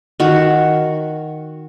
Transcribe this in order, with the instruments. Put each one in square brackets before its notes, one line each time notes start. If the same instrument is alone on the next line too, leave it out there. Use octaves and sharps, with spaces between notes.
[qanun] D#3 F#4